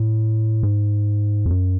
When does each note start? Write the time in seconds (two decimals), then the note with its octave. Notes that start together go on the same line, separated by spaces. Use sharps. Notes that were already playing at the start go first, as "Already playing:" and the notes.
Already playing: A2
0.63 G#2
1.46 F2
1.50 F#2